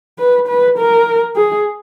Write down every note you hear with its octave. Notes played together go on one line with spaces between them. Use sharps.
B4
B4
A#4
G#4